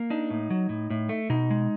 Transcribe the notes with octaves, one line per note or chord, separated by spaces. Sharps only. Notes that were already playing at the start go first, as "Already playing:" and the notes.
Already playing: A#3
D4 D#4
A2
F#3
A2
A2
A3
B2 D#4
G#3